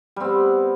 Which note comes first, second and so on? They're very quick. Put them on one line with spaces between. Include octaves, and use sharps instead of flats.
G3 C4 B3